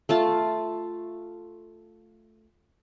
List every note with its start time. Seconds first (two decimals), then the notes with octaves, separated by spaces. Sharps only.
0.09 A3 F4 A5